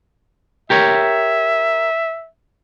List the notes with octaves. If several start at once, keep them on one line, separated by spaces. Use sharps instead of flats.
G4 A#4 C#5 E5